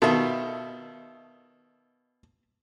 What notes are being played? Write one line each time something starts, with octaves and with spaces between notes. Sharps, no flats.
B2 D#3 F4 A4 E5